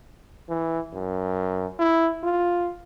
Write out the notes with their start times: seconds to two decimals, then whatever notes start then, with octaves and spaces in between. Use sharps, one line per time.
0.49 E3
0.94 F#2
1.79 E4
2.24 F4